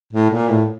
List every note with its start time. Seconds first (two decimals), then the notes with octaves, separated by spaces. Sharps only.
0.13 A2
0.30 A#2
0.49 A2